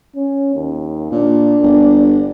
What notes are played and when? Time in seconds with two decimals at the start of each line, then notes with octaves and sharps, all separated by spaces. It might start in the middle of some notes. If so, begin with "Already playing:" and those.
0.16 C#4
0.54 D#2
1.12 A#2 D4
1.63 G1